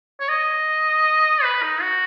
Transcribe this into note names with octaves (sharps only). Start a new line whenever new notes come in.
C#5
D#5
B4
D#4
F#4